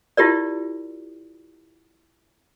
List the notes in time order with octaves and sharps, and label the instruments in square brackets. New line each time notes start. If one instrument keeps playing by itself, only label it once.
[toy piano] E4 F4 G4 A#4 D5